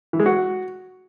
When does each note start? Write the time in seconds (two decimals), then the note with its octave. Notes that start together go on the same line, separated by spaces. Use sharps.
0.13 E3
0.20 G#3
0.26 F#4